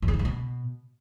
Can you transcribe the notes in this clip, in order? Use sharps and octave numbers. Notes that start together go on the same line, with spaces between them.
F2
C#3
A2
G2
B2